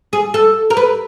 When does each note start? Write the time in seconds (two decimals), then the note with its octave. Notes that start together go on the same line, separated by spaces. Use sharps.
0.13 G#4
0.34 A4
0.70 A#4
0.77 B4